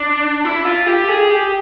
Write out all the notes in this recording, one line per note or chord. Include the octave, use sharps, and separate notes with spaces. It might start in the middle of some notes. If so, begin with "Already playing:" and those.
Already playing: D4
E4
F4
G4
G#4
G4